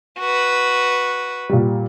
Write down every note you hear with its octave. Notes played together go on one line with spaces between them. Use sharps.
F#4 B4
A#2 G3